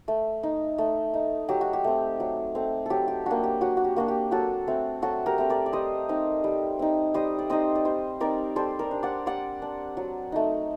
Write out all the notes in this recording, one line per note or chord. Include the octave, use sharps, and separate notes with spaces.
A3
D#4
A3
D#4
F#3 G4
F#4
G4
A3 C4
F#3
A3 C4
F#3 G4 A4
G4
A#3 D4 F#4
G4
F#3 F#4
F#4
G4
A#3 D4 F#4
G4
F#3 F#4 A4
A3 C4
F#3 F#4 A4
G4 A#4
A3 C4
A#4 D5
D5
G3 C5 D#5
C4 D#4
G3
C4 D#4
G3 C5 D#5
D5
C4 D#4 C5 D#5
D5
G3 C5 D#5
C4 D#4 A#4 D5
G3 A4 C5
A#4 D5
D4
D5 F#5
G3 D5 F#5
D4
F#3
A3 D#4